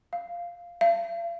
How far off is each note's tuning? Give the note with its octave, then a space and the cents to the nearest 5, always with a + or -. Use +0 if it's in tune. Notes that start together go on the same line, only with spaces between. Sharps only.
F5 -5
F5 -45